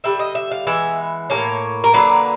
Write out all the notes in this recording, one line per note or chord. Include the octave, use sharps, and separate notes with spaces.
D3 G3 C4 E5
D#5
E5
F5
E3 G#3 B3 E5
A2 F3 A#3 C#5
A#4
D3 F#3 A#3 B4